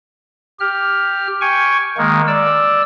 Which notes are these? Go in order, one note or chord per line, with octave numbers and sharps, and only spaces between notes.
G4 F6
G5 G#5 C#6
D#3 G#3 A#3
D5 E6